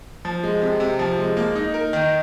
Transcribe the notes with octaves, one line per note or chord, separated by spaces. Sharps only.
F3
G#3
C3
C3
F3
G#3
A#3
D#4
A#4
D#3